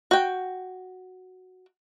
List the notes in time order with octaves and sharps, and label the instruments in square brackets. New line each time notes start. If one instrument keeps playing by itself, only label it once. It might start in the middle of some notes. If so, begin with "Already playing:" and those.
[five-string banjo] F#4 G5